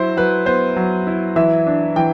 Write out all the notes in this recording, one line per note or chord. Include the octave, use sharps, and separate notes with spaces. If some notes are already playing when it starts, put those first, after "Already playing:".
Already playing: F#3 E4 C5
F#3 B4
B3 C5
F#3
E4
E3 E5
D4
E3 G5